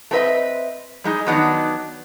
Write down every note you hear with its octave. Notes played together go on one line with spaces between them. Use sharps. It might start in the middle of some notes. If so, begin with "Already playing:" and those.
A3 C4 D#4 B4 D#5 E5
G3 G#3 D#4
D#3 F#3 B3 D4 D#4